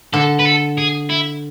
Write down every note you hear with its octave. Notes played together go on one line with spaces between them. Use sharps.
D3 A4
B4
A4
G#4
E4